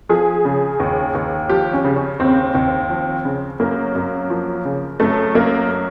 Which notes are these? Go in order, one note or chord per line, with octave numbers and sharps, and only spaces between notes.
F3 G#4
C#3
D#2
D#2
F3 G4
C#4
C#3
C#4
D#2 C4
D#2
F3
C#3
F#2 A#3
F#2
F3
C#3
F#2 A3
F#2 A#3